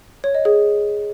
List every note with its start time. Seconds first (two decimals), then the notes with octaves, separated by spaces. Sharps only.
0.24 C#5
0.35 D#5
0.45 G#4